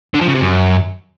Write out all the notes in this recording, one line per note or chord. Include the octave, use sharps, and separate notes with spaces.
D3
F3
C#3
C3
F#2